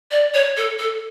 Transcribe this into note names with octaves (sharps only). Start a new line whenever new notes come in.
D5
C#5
A4
A4